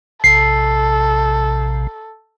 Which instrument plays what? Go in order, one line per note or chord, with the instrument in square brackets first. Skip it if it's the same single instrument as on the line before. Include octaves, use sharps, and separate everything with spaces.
[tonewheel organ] A#1 C3 [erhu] A4 [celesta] C7